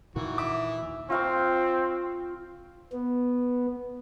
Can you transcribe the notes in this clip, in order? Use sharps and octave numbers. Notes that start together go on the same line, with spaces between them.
D#2 A#2 D#3 E3 F#4
E5 D6
C4 F4 F5 C#6
B3